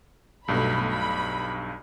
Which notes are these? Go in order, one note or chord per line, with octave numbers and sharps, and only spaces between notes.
B1 G2 B2 A3 B5
B5